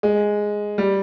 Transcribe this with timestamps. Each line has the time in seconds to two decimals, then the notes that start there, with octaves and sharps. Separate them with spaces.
0.03 G#3
0.78 G3